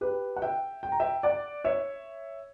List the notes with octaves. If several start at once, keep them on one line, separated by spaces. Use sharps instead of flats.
G4 B4
F#5
E5 G5
G5
A#5
E5 G5
D5 F#5
C#5 E5